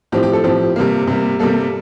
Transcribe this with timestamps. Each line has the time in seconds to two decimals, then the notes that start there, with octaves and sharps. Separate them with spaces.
0.12 A2 F3 C4 G4
0.23 G4
0.33 A4
0.44 A2 F3 C4 G4
0.76 C3 G3 A#3
1.07 C3 G3 A#3
1.39 C3 G3 A#3 A4